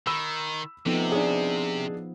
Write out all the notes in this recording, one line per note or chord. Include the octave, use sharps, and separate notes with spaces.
D#3 B5 E6
C3 F3 A3 B3 D#4
D4 G#4